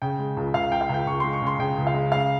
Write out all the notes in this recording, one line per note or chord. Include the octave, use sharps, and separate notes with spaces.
C#3 G5
G#3
C#2
C#2 F5
C#2 G5
F5
C#2
G5
C#2 C#6
G#3 C6
C#6
C#3 C6
C#3 G5
C#2
F5
G#3
C#3 F5